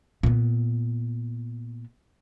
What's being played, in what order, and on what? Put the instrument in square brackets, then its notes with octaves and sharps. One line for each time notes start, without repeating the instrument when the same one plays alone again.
[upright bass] A#2 B3